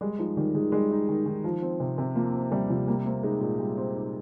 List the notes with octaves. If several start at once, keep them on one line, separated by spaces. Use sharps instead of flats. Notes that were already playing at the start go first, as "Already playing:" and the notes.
G3 G#3
F3 D#4
D#3 G3
D#3 G#3
G3 G#3
D#4
D#3
D#3
F3
C4
C3
C3
F3 A#3
C4
C3 G3
C3 F3
G3 A#3
A#3 C4
G#3 D#4
A#2 G#3
G3
C4
D#4